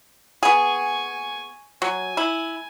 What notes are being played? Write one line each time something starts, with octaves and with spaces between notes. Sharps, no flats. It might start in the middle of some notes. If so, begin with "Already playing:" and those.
B3 G#4 G#5 C#6
F#3 G#5
E4